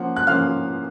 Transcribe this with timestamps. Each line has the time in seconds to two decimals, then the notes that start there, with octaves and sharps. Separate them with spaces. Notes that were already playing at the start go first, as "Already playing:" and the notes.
Already playing: F3 A#3 C#4 F#5
0.16 F#6
0.27 F3 A#3 C#4 F5 F6